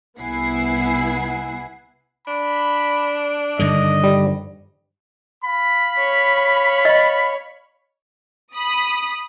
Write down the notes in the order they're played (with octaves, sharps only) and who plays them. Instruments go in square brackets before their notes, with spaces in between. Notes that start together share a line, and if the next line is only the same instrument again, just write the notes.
[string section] C2 B3 E4 F#5 G#5 C7
[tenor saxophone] D4 [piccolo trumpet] B5
[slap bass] G2 D3 D#3 [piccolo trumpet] D#5
[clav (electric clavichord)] G3
[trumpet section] F5 B5
[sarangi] C#5
[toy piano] D#5
[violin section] B5 D#6